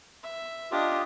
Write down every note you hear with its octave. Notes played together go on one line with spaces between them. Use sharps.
E5
D4 F4 G4 D#5